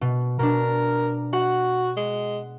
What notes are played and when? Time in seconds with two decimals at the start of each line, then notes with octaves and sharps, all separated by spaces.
0.01 B2
0.39 B2 D4 A#4
1.33 F#4 F#5
1.97 G#3